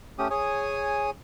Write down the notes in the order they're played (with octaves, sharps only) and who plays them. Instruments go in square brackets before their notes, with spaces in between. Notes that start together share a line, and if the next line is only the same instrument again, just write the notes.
[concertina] A3 C#4 G4 D#6
G#4 C#5 G#5 D#6